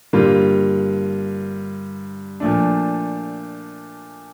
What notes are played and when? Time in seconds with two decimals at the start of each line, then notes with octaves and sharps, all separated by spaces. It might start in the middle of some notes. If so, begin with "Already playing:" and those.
0.13 G2 D3 G3 A#3 F4
2.40 A#2 F3 A3 D4